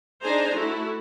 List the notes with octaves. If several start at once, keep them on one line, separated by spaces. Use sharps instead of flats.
D4 D#4 G#4 C5 G#5 A#5
A3 E4 F#4